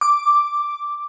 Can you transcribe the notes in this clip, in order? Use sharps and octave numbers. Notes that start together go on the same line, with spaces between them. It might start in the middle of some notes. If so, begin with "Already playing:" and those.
D6